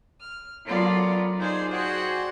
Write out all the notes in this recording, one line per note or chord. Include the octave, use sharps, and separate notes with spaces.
F6
F#3 B3 F4 A4 A#4 D5
D#4 F4 G#4 C5 D5 F5
F#4 G#4 C5 D5 F#5 G5